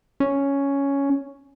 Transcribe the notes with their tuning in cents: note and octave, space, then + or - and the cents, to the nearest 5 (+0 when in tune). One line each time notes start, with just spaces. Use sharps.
C#4 +5